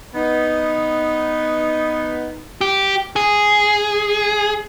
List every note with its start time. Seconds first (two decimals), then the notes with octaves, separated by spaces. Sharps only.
0.15 B3 D#4
2.61 G4
3.16 G#4